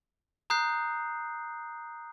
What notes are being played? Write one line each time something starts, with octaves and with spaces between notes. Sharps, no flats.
A#5 D#6 F#6 G6 C7